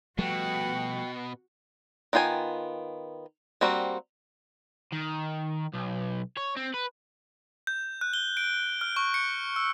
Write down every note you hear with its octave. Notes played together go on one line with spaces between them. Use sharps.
B2 F3 G3 A3 F#4 F#5 G5
D#3 B3 F4 G5 G#5
G3 A#3 C4 F#4
D#3
B1
C#5
C4
B4
G6
F#6
G7
D7
F6
C#6
C#7
E6